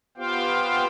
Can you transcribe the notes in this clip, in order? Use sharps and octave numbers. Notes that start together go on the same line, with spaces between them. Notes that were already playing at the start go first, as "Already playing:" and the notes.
B3 F4 G4 C5 F5 G5